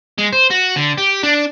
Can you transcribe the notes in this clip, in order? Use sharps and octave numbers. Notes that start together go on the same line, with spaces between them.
G#3
C5
F#4
D3
G4
D4